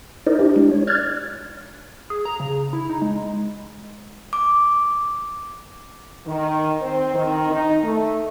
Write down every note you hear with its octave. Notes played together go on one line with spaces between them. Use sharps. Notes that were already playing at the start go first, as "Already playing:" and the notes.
D#4 E4 A#4 C5 D5 D#5
D4 E4 G4
G#3 D4
C#5
D5 F6 F#6 G#6 A6
G#4
A#5
C#3
E4
D#4
G#3
D6
D#3
C4
D#3
D#4
A3